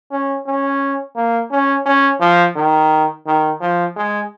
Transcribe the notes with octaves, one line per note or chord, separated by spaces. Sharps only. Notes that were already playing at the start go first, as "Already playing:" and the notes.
C#4
C#4
A#3
C#4
C#4
F3
D#3
D#3
F3
G#3